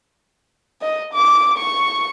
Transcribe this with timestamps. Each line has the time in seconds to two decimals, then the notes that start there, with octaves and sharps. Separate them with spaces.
0.82 D#5
1.14 D6
1.58 C#6